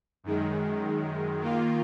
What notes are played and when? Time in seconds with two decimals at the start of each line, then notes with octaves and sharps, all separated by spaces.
0.24 F#2 D#3 G#3
1.41 D#3 A#3 F4